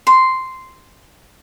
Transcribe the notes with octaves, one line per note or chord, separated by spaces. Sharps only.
C6